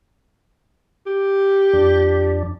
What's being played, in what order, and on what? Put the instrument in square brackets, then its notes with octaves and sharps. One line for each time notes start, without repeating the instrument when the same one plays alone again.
[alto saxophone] G4
[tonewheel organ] F2 D4